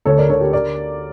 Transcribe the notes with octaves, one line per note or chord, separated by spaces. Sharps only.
D2 A4 C#5
A#4 D5
D3 A4 C#5
G4 A#4
A#4 D5